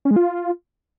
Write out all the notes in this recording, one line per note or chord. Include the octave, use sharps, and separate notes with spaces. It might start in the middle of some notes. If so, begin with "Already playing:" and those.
C#4
G#3
F4